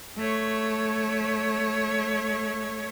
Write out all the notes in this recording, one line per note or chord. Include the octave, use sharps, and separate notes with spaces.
A3 C#5